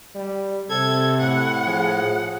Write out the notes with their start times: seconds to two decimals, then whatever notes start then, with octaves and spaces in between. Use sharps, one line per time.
0.15 G3
0.70 C3 A4 G#6
1.20 A2 F#5
1.67 F3 G#4